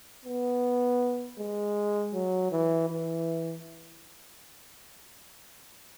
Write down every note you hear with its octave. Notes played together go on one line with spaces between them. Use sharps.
B3
G#3
F#3
E3
E3